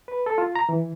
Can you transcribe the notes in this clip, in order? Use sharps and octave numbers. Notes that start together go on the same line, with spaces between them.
B4
A4
F4
A#5
E3